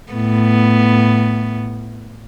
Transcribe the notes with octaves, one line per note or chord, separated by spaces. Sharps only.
A2 B3